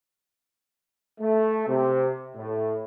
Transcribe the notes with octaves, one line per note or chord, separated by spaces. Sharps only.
A3
C3
A2